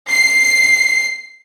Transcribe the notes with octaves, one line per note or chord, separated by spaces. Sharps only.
C7